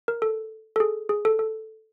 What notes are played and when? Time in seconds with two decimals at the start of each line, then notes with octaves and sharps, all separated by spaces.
0.08 A#4
0.22 A4
0.76 A4
0.80 G#4
1.09 G#4
1.25 A4
1.39 A4